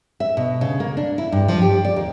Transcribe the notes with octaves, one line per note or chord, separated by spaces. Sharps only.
E5
B2
C#3
A#3
D4
E4
G2
F3
G4
D5
D#2